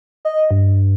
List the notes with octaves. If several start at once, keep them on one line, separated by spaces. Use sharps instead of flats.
D#5
G2